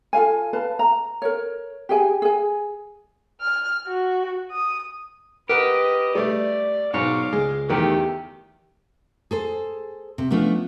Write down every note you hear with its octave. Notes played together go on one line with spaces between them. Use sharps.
F4 A4 F5 G#5
B4 F5 A5
A#5
A#4 C#5
G4 G#4 G#5
G#4 G#5
F6
F#4
D#6
G4 A#4 B4 D#5 F#5
G3 A3 D5
B1 G#2 B2 C#5 F5 D6
C#2 G#3
E2 D#3 A3 G4 A#4
G#4 A4 C5
C3
F3 A3 B3 C#4 D4